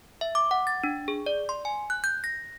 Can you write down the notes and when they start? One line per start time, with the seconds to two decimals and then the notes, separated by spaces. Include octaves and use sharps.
0.21 E5
0.35 D6
0.51 F#5
0.67 A6
0.84 D4
1.08 G#4
1.26 D5
1.49 C6
1.65 G#5
1.90 F#6
2.04 G6
2.24 A#6